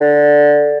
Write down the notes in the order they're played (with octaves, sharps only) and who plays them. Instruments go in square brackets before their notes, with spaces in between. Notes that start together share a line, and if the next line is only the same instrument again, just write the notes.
[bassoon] D3